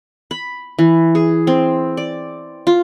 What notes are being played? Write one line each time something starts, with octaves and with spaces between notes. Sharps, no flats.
B5
E3
G#4
C4
D5
F4